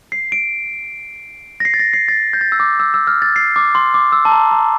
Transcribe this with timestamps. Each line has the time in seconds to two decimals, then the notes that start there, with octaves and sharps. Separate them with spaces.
0.12 C7
0.32 D7
1.60 A#6
1.65 C7
1.74 A6
1.80 A#6
1.93 C7
2.08 A6
2.33 G6
2.41 A6
2.52 E6
2.60 D6
2.80 E6
2.94 E6
3.07 F6
3.22 A6
3.36 C7
3.56 D6
3.75 C6
3.94 D6
4.12 E6
4.25 A5
4.32 A#5
4.51 A#5